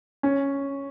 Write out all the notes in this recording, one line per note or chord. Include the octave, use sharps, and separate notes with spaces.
C#4